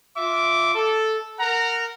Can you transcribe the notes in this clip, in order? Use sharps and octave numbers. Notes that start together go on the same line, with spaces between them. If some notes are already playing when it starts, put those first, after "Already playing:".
F4 E5 D6
A4
A#4 F#5 A#5